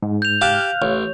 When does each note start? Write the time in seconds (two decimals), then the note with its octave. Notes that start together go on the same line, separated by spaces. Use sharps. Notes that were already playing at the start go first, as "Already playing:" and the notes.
0.02 G#2
0.22 G6 F7
0.41 G4 F5 A5 F6 F#6
0.82 A1 C#5